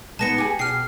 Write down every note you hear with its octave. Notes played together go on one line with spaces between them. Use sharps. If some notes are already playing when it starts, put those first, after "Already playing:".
G#3 B3 D#4 A5 A#6 C#7
G4 G#4
B2 G4 G#4 F6 C7